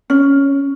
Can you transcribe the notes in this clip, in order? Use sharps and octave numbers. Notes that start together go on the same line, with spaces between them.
C#4